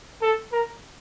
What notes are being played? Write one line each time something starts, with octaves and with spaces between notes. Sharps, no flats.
A4
A#4